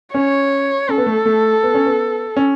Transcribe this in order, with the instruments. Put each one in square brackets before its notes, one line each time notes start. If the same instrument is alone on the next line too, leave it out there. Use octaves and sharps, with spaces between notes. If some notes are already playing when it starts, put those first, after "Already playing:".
[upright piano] C#4 [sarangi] C#5
[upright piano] C#4 [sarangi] A4
[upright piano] B3
A3
A3
B3
C#4
B3
C#4